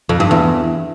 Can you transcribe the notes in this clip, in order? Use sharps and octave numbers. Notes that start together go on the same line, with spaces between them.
F2
G2
E2